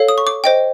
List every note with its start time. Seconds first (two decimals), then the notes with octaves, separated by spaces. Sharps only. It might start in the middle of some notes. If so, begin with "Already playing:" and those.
Already playing: A4 C#5 F5
0.09 D#6
0.18 C#6
0.27 D6
0.44 C5 D#5 G5